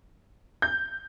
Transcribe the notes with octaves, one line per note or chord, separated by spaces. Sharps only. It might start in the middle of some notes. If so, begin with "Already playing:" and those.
G6